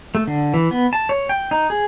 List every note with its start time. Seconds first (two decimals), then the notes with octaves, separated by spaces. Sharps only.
0.15 A3
0.27 D3
0.54 E3
0.71 B3
0.93 A5
1.09 C#5
1.29 G5
1.51 D#4
1.70 G#4